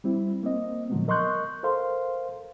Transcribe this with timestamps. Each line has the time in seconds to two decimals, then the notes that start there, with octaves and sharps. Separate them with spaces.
0.04 G3 C4 E4
0.43 A#3 C4 D#5
0.90 A#2 D3 F3 F#3 G#3 B3
1.08 A#4 D#5 C6 C#6 F#6 G6
1.63 A4 A#4 C5 F5 C6